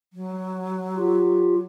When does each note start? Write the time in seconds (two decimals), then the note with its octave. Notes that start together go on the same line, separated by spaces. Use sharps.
0.13 F#3
0.97 F4 G4